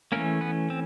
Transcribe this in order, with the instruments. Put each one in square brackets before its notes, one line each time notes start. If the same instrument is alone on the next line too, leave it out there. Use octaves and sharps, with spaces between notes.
[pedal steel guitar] E3 A3 A#3 C#4 A#4
B3 B4
C4